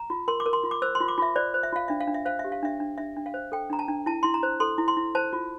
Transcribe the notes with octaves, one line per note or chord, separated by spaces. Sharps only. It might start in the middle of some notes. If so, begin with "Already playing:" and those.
Already playing: A#5
F4
A#4 C6
D6
A#4
C6
F4
D6
C5 E6
C6
F4
D6
F4 E5
C5 D5
C5
E5
F4 F5
D4 E5
F5
D4
E5
C5 F5
E5
G4
F5
D4 E5
D4
D4 E5
D4
F5
C5
A4 G5
D4 A#5
A5
D4
E4 A5
E4 C6
A#5
C5
A4 C6
E4
C6
E4
C5 A5
F4